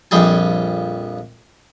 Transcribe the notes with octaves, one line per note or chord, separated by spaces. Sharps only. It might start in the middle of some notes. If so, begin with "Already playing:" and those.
A#1 F2 F3 G3 G#4 G#5